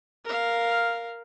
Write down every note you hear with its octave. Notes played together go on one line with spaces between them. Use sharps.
A#4 F5